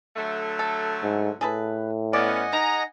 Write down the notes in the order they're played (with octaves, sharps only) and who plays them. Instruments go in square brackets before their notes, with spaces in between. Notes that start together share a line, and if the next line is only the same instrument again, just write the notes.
[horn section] D3 F#3 A3
[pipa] A4
[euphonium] G#2
[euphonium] A2 [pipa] G#4 A4 B4
[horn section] B3 C#4 [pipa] D5 [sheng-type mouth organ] D#5 F#5 G#5
[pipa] D#4 [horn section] G#4 A#5